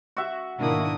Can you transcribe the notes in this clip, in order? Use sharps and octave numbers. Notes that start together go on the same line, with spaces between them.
F#4 E5
G#2 B2 D#3 A#3 D4 E4 D#6